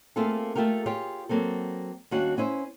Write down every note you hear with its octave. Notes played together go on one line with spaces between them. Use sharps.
A3 A#3 C4 F4 G#4 A4
A3 F4 G4 A4 A#4
F4 G4 G#4 C#5
F#3 A#3 C4 A4
D#2 G3 C#4 D4 F#4 F5
B3 C#4 E4 C5